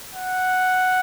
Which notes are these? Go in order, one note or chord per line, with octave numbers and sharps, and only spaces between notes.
F#5